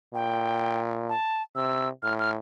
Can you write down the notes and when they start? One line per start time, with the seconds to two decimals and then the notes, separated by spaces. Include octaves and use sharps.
0.13 A#2 G5
1.09 A5
1.55 C3 E6
2.03 A2 F6
2.19 F6